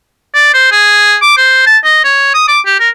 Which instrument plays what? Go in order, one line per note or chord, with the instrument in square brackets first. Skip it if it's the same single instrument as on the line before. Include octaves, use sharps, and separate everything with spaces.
[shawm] D5
C5
G#4
D6
C5
A5
D#5
C#5
D#6
D6
G4
A#4